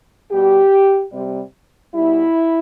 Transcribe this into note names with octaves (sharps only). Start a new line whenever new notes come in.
B2 G3 G4
C3 G3
B2 G3 E4